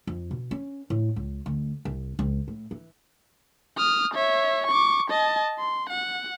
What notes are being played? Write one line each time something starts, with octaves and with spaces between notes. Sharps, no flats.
F2
B2
C#4
A2
C#2
D2
C2
C#2
A2
E3
D#6 F6
C#5 E5
C#6 D6
D#5 A5
C6
F#5